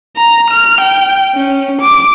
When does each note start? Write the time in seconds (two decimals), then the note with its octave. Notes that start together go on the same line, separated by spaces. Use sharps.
0.17 A#5
0.50 F6
0.81 G5
1.35 C#4
1.81 D6